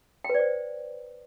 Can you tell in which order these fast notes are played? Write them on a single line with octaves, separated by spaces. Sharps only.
G5 B4 D5 C5